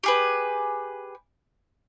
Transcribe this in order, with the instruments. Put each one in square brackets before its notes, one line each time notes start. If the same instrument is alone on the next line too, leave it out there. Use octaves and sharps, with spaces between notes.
[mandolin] G4 G#4 B4